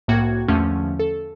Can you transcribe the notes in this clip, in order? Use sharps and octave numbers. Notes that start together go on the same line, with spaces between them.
C2 A2 A#3 F#4 G5 G#6
E2 D3 F3 A3 C#4
A4